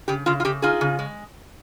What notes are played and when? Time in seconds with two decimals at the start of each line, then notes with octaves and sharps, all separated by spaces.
0.08 C#3 G4
0.26 C#3 F4
0.40 F4
0.45 C#3 G4
0.62 D#4 F4 G#4
0.81 C#3
0.99 G#3